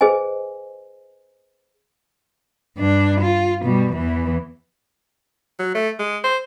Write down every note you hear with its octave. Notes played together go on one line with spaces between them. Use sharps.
G#4 B4 C5 D#5 G#5
G2 D4
F4
B2 G3
E2 E3
F#3
A3
G#3
C5